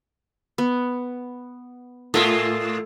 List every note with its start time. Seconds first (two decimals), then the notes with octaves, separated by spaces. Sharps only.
0.58 B3
2.14 A2 A3 F4 A#4 E5 G#5